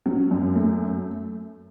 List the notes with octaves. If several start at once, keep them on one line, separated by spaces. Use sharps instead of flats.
F#3 C#4
F#2
A3